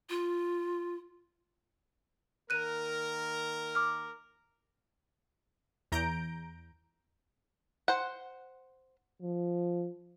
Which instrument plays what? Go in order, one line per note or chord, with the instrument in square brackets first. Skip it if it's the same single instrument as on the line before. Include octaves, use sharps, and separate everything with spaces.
[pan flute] F4
[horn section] D#3 A#3 A#4 [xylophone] F#6 D#7
[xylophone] D6 F6
[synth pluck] E2 A#5 G6 D7
[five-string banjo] C5 F#5
[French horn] F3